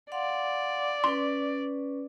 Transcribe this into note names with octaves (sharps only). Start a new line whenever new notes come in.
D5 F5 F#5 C6
C#4 B4 C6